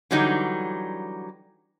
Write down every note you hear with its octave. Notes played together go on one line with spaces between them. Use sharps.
D3 E3 F#3 G3 D#4